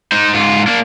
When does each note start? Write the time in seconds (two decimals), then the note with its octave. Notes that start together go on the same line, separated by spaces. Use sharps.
0.12 D#4 C5
0.34 G#2 F4
0.67 A#3 D4